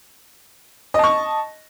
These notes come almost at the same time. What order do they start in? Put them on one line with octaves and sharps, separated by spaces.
D#5 A5 C#6